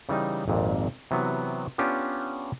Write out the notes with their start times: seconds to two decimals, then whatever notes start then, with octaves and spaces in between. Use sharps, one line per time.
0.09 C#3 E3 G3 D#4
0.48 G#1 F2 A#2
1.11 C3 E3 F#3 B3
1.78 B3 C#4 D4 F4 G4